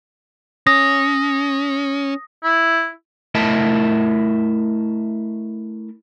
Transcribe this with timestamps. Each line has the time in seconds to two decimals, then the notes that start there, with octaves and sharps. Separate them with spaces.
0.67 C#4 D#6 A#6
2.44 E4
3.35 A3 E4 A#4 D#5 E5 A5